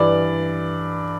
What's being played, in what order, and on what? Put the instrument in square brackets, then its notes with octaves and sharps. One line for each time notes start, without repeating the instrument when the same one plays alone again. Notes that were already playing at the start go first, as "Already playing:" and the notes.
Already playing: [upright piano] G2 E3 D5